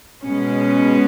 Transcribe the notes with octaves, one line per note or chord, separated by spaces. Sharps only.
B2 G#3 B3 C#4